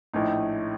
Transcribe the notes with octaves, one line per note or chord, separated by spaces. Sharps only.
A#1 A2 A3 D#4